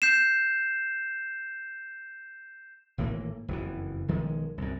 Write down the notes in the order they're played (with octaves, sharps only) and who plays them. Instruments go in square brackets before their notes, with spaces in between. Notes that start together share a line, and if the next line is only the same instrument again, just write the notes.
[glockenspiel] G6 C7 E7
[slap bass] G#1 A2 E3 A#3
F#1 F2 G#2 E3
B1 D#3 F3 G#3
C2 F#2